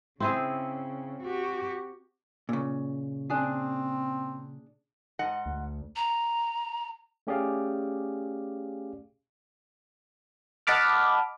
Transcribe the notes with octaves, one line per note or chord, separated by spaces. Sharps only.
C#3 C4 E4 G#4
F#4 G4
A#2 C#3
C4 D4 G#4
G#2 D#5 F#5
D2
A#5
A3 C#4 G4 G#4 D5 F5
D#5 F#5 A5 B5 D6 F6